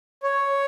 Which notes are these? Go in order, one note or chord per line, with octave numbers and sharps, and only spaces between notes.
C#5